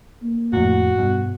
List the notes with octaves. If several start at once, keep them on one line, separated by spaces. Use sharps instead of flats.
A#3
F2 A2 F#4
G2 B2